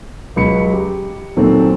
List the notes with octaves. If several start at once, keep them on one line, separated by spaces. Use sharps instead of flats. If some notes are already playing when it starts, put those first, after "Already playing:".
C#2 F#3 B5 C#7
G4
A#2 D#3 F#3 C4 A4